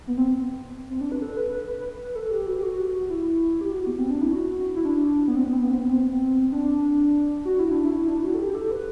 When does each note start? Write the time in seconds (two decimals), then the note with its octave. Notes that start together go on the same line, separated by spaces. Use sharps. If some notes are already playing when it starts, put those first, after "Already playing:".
0.07 B3
0.17 C4
0.90 C4
1.01 D4
1.12 B4
1.22 A4
1.37 B4
1.52 B4
1.67 B4
1.81 B4
1.95 B4
2.16 A4
2.31 G4
2.46 F#4
2.55 G4
2.63 F#4
3.09 E4
3.61 G4
3.72 F#4
3.87 B3
3.98 C4
4.10 D4
4.22 E4
4.33 F#4
4.75 E4
4.85 D4
5.28 B3
5.36 C4
5.45 B3
5.53 C4
5.62 B3
5.70 C4
5.79 B3
5.89 C4
6.52 D4
7.45 F#4
7.59 E4
7.71 D4
7.85 E4
8.08 D4
8.18 E4
8.24 F#4
8.34 A4
8.39 G4
8.55 A4
8.71 B4